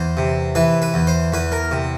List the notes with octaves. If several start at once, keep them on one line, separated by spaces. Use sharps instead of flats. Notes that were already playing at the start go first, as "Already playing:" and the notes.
Already playing: E2 C5
C3
E3 B4
B4
E2
C5
E2 B4
A#4
C3